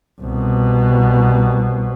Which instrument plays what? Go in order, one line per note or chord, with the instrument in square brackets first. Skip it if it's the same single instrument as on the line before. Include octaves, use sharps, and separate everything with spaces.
[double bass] C2 B2